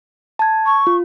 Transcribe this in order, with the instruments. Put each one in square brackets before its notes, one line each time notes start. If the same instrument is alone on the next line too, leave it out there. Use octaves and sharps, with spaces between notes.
[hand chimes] A5 G#6
[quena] C#6
[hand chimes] F4